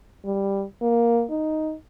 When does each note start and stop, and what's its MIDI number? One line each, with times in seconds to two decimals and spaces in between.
0.25 0.64 55
0.82 1.25 58
1.30 1.75 63